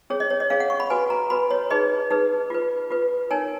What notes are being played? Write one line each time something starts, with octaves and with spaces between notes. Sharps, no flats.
C#4 G#4 C#5
D#5
C#5
D#5
C#4 G#4 C#5 F5
F#5
C#6
B5
F#4 B4 G#5
A#5
F#4 B4 B5
C#5
D#4 G#4 B4 D#5
D#4 G#4 B4
F4 B4
F4 B4
D#4 A#4 C#5 G#5